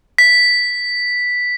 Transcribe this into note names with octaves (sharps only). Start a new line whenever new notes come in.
B6